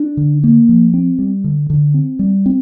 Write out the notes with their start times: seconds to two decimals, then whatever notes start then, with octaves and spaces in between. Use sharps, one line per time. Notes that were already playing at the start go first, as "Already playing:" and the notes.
Already playing: D4
0.17 D3
0.44 A#3
0.69 F3
0.94 C4
1.19 G3
1.44 D3
1.70 D3
1.94 C4
2.19 G3
2.46 C4